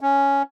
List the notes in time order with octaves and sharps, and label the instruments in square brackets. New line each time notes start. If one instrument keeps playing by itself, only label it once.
[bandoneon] C#4